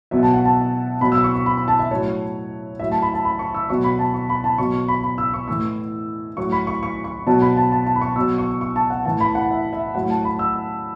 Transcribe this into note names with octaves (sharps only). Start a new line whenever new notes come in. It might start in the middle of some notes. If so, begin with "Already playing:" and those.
B2 F#3 E5
A5
F#5
A5
B2 F#3 B5
E6
C#6
C#6
B5
B5
A5
E5
A2 F#3 C#5
A2 F#3 E5
A5
B5
A5
B5
C#6
E6
B2 F#3 C#6
B5
A5
C#6
B5
A5
B2 F#3 C#6
C#6
B5
B5
E6
C#6
A2 E3 E6
A2 F#3 C#6
B5
C#6
C#6
C#6
B2 F#3 A5
B5
A5
A5
A5
B5
C#6
B2 F#3 E6
C#6
C#6
A5
F#5
A2 E3 A5
B5
F#5
E5
E5
A2 F#3 F#5
A5
B5
E6